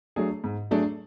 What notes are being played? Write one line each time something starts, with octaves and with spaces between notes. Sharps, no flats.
F#3 A3 D4 G#4
G#2
F#3 A3 D4 G#4